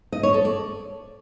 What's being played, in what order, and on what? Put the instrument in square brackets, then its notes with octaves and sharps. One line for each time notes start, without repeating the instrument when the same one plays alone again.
[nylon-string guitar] D#5
C#5
A4
D5